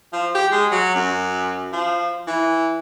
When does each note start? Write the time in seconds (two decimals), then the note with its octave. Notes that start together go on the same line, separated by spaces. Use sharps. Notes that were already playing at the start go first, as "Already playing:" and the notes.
0.13 F3
0.35 G4
0.51 G#3
0.71 F#3
0.95 F#2
1.73 F3
2.27 E3